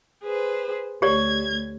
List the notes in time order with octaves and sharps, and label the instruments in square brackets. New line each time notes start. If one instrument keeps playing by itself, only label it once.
[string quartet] G#4 B4 C5
[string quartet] D2 G#6 [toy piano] G4 C#5 D5